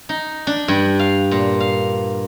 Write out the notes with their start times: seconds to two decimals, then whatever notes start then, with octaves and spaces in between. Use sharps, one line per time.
0.09 D#4
0.47 D4
0.68 G2
0.99 F5
1.31 A#2
1.60 F5